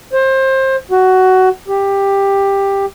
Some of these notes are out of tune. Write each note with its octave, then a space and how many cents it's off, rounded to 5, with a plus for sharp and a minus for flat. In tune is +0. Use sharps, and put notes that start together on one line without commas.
C5 +25
F#4 +15
G4 +10